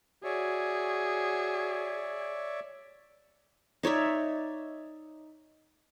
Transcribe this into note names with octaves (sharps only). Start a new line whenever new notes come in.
F#4 G#4 C#5 D5 E5
D#4 C#5 D5 E5